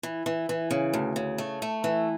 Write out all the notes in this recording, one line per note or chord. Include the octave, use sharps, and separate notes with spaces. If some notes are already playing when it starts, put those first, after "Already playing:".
E3
E3
E3
C#3
D2
C#3
A3
A3
E3